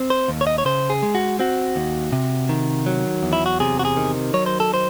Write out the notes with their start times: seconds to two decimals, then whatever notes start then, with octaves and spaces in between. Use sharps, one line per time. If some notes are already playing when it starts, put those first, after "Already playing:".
Already playing: C4
0.10 C5
0.28 D#2
0.41 C#5
0.47 D#5
0.58 C#5
0.65 C#3 C5
0.90 G#4
1.03 G#3
1.15 F#4
1.39 C4 F#4
1.76 D#2
2.13 C3
2.49 D#3
2.86 F#3
3.23 E2
3.33 E4
3.46 F#4
3.60 C3 G#4
3.79 F#4
3.85 G#4
3.97 D#3
4.34 F#3 C#5
4.46 C5
4.60 A4
4.74 C5